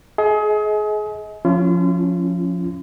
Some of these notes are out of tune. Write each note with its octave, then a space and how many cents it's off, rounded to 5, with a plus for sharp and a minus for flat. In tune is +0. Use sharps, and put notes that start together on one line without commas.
G#4 +30 D#5 +35
F3 +20 C#4 +0 F4 -40